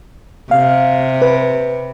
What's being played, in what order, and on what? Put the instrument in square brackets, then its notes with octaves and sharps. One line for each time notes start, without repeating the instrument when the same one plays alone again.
[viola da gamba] C3 [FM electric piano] F5
[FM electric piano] B4